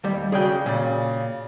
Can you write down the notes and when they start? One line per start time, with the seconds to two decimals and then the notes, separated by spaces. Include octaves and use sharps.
0.04 D#2 G3
0.32 C#3 F#3 G#4 D5 G5
0.66 A#2 C#3 D5